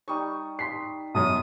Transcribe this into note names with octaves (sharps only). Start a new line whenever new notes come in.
G3 D#4 C#6
C6 B6 C7
F#2 B2 D#6